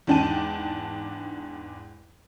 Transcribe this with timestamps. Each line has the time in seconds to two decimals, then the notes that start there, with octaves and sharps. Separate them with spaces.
0.07 E2 G#2 D4 G5 A5 D#7